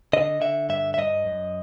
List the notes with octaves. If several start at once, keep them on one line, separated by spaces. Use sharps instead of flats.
D3 D#5
D3 E5
G2 E5
E5
G2 D#5
F#2